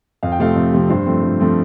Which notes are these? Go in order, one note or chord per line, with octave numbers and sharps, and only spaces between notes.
F2 F5
G5
C3 F3 A3 C4 F5
F2
C3 F3 A3 C4
G2 C5
F3 A3 C4
G2
F3 A3 C4